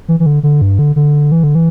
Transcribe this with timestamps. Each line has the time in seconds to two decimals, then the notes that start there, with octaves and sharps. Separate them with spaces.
0.08 E3
0.20 E3
0.26 D3
0.43 D3
0.62 G2
0.79 D3
0.96 D3
1.32 E3
1.44 D3
1.55 E3